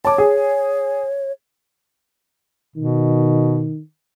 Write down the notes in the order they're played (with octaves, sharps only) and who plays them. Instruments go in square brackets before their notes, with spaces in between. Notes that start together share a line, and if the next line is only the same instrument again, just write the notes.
[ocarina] C#5 [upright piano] A5 D6
[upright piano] G#4
[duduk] B2 [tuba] D#3